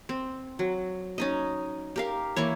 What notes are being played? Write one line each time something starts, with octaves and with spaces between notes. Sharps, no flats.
C4
F#3
C#4 D#4 D#5
G4 A#4 F5
E3 A#3 E4 C#5